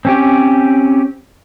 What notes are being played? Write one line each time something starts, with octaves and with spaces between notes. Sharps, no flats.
C4 C#4 G4